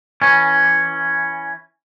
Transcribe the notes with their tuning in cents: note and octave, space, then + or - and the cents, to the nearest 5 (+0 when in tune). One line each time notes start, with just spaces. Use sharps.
E3 +0 C#4 +0